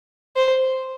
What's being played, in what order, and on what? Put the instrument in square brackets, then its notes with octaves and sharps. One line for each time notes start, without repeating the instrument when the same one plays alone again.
[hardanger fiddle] C5